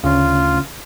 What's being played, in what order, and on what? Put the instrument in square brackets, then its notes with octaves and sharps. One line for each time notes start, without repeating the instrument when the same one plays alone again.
[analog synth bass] D2 [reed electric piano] C#3 C#4 [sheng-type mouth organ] F4